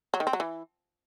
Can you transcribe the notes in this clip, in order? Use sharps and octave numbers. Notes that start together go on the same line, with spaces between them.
F#3
D#3
C4
F#3
E3